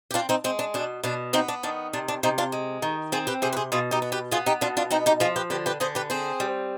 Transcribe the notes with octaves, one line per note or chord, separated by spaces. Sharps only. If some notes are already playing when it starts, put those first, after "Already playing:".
G4
C4 D4 F4
C4 D#4
G#3 C4
D4
B2 D4
B2 D4
B3 C4 D#4
D4
D#3 D4
C3 D4
D4
C3 C4 D#4
D4 F4
G#3
D#3
C4 F4 G#4
G4 B4
C3 G#4 C5
B4
G#4 C5
B2 F4 G#4
D#4 G4
B3
G4 B4
B3 F4 G#4
D#4 G4
B2 D4 F4
D4 F4
B3 C4 D#4
D#4 G4
F3 F4 G#4
G4 B4
D3 G4 B4
G4 B4
D3 G#4 C5
G4 B4
C4 G#4 C5
G3